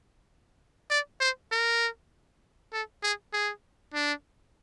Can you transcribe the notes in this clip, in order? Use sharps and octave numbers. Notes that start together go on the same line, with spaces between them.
D5
C5
A#4
A4
G#4
G#4
D4